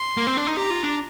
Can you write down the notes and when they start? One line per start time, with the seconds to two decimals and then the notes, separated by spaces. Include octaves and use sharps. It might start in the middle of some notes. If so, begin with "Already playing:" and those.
Already playing: C6
0.17 A#3
0.27 C4
0.37 D4
0.47 D#4
0.57 G4 A#5
0.70 F4
0.83 D4